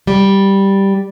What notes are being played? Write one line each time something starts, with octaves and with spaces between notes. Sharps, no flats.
G3